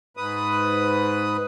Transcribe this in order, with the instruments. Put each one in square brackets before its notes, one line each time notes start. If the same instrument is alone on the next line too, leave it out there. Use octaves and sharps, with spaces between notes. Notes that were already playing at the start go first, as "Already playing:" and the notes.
[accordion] G#2 B4 D#6